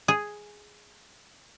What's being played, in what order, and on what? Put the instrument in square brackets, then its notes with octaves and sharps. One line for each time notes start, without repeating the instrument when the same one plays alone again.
[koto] G#4